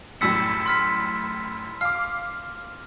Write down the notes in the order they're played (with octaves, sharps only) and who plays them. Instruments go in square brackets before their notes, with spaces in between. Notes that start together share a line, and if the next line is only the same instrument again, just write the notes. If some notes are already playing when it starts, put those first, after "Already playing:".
[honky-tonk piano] F#2 A2 G3 [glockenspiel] E6 B6 C#7
[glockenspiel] C6 F6 B6
[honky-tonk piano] F5 D6 [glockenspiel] F6